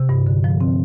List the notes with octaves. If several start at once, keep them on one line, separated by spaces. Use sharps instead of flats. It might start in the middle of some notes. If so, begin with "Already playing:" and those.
Already playing: C3
G2
D3
F3
C4